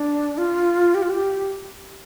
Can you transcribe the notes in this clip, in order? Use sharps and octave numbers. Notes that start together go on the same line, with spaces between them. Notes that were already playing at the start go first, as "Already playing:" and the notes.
Already playing: D4
F4
G4
F4
G4